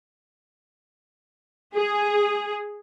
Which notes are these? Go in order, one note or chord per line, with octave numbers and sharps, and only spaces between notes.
G#4